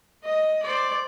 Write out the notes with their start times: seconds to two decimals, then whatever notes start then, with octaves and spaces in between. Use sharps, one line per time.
0.23 D#5
0.62 C5 D5